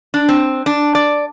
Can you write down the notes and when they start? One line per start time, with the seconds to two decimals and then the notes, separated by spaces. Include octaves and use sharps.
0.14 D4
0.29 C4
0.66 D4
0.95 D5